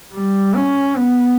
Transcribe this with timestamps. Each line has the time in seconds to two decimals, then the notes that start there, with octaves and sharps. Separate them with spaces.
0.13 G3
0.55 C#4
0.97 B3